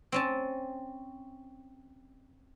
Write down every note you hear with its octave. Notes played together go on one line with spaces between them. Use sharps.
C4 C#4 A5